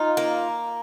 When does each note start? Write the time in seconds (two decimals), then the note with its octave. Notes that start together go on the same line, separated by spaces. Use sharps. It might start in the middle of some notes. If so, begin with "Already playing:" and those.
Already playing: D#4 F4
0.17 A#3